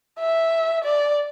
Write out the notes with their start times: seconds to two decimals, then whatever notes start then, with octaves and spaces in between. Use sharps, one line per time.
0.20 E5
0.85 D5